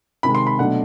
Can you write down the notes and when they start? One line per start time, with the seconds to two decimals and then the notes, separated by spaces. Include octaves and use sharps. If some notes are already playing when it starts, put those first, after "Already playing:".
0.23 C3 D#3 G#3 B5
0.35 C6
0.47 B5
0.59 B2 F#3 A3 D4 F#5